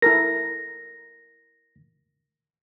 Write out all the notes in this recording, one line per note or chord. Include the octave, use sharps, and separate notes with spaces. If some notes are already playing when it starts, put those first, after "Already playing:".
E4 A4 A#4 A#6